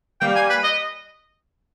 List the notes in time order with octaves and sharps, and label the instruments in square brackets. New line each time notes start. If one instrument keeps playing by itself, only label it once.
[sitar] G3 A#3 [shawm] G5
[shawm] G#5
B4
D#5